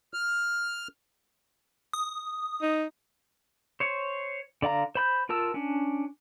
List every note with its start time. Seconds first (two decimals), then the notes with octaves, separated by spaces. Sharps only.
0.14 F6
1.93 D#6
2.62 D#4
3.80 C5 C#5
4.62 D3 D5 F5 A#5
4.95 C5 B5 G6
5.29 F4 A#4 A5 E6
5.54 C#4 D4